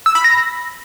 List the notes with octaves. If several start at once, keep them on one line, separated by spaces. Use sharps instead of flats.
E6
B5
A#6